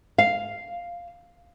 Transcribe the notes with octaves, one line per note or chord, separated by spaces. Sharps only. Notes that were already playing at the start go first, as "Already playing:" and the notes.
F5